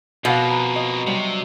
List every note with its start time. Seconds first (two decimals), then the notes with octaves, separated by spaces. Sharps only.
0.25 F2 B2 A#3 F5 F#5 B5
0.51 A#5
0.76 D#5
1.07 C3 F#3 G3 D4